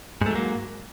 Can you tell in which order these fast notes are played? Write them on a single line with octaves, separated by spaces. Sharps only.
G#2 A3 F#3 A#3